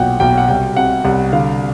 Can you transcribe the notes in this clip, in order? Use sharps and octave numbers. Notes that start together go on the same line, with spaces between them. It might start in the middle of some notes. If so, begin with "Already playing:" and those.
Already playing: B1 A#2 F#5 G5
B1 G5
F#5
C2 G5
C3 F#5
C2 F#5
D3 F5